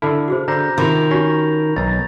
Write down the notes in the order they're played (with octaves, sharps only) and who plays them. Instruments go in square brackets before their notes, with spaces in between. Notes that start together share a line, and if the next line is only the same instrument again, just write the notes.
[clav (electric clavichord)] D3 E4 [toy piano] A4 [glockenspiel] A5 F6
[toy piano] F#4 G#4 C5
[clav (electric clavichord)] D3 [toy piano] C5 B5 [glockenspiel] A#5 G6 A#6
[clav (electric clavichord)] C3 [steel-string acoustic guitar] D#3 [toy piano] C#4 F4 [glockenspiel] B5 F7
[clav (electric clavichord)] C#4 [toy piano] F#4 G4 [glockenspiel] C#6 A#6
[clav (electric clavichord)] B1 A#5 [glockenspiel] A6